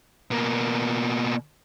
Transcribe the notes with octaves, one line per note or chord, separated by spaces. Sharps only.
B2 A#3